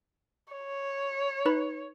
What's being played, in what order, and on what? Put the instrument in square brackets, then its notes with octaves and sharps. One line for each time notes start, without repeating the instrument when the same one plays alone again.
[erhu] C#5
[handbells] D#4 B4 B5